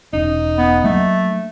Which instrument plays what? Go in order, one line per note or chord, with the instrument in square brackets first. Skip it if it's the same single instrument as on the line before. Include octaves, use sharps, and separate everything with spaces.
[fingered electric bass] E1 C#4 [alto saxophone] D#4
[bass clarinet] B3
[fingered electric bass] F#3 A#3 D4 [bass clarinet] A3